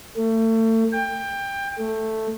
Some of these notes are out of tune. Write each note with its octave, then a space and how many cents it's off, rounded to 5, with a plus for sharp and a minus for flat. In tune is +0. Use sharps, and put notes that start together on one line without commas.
A3 +30
G5 +20
A3 +0